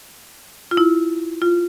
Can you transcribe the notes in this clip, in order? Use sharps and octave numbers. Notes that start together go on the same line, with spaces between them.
F4
E4
F4